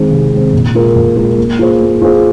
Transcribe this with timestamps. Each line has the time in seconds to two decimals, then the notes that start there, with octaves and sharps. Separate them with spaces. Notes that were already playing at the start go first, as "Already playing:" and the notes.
Already playing: D#3 G#3 C4
0.11 C3
0.32 D#3 G#3 C4
0.53 A#2
0.75 G#3 F4 A#4
0.96 A#2
1.17 G#3 F4 A#4
1.38 A#3
1.59 F4 G#4 C5
1.81 A#3
2.02 F4 G#4 C5